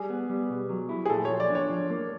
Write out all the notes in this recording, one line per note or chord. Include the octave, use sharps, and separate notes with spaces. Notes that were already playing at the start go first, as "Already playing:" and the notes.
Already playing: G3 G#4
B3
G3
B2
F#3
E4
G#4
A#2 A4
C#5
F3
D5
D4
C#5
F3
A#3